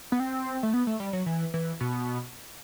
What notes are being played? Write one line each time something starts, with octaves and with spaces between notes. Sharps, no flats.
B3
C4
A3
B3
A3
G3
F#3
E3
E3
B2